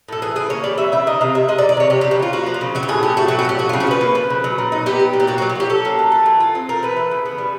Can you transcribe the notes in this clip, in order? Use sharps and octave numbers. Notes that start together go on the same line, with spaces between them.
A2 A4
E3 G#4
C#3 G#4
A#3 C#5
G3 D5
E3 E5
C#3 E5
D#3 D#5
C3 F5
C3 E5
G#3 D#5
D5
D#3
D5
C3 C#5
F3 G4
C#3 G4
F#4
D#4
F4
A#3 F#4
F3
F4
C#3
F#3 F#4
G4
A2 G#4
A2 G4
A3 F#4
F#3 F#4
F#4
A2 G4
F3 F#4
C#3 F4
F#4
C#4 B4
A#3
F3
C#3
F#3
A#2
D#4
B3 G4
F#3
A#2
G4
A#3 F#4
F#3 F#4
G4
F4
G4
C#4 A4
A#3
F#3
A3
E3
F4
C4
A3 A#4
E3 B4
E3
C#3
B3
G3